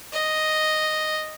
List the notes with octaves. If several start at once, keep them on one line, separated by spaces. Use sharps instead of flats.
D#5